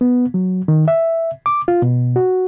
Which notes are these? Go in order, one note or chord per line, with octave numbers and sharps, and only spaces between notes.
B3
F#3
D#3
E5
D6
F4
B2
F#4